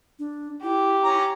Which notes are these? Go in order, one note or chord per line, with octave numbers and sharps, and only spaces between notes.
D4
E4 G4
C#4 A#5 D6